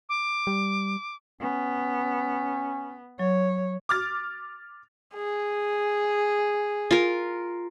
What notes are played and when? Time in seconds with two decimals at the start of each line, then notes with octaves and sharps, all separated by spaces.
0.09 D6
0.47 G3
1.41 B3 C#4
3.19 F#3 C#5
3.89 D6 F6 A6
5.14 G#4
6.91 F4 A#4